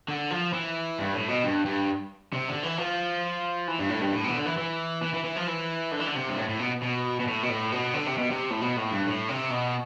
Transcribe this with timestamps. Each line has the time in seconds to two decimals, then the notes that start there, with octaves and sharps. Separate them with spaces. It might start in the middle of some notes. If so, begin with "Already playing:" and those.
0.08 D3
0.31 F3
0.53 E3
0.98 G2
1.13 A2
1.28 B2
1.43 G2
1.65 G2
2.33 C3
2.48 D3
2.63 E3
2.78 F3
3.68 E3
3.79 G2
3.90 A2
4.01 G2
4.13 A2
4.24 B2 E3
4.34 D3
4.46 E3
4.58 E3
5.02 E3
5.14 E3
5.25 E3
5.36 F3
5.47 E3
5.92 D3
6.00 E3
6.07 D3
6.15 C3
6.29 G2
6.37 A2
6.49 A2
6.59 B2
6.82 B2
7.20 B2
7.27 A2
7.43 B2
7.49 A2
7.72 B2
7.94 D3
8.06 C3
8.18 B2
8.31 C3
8.51 A2
8.62 B2
8.77 A2
8.92 G2
9.07 A2
9.29 C3
9.51 B2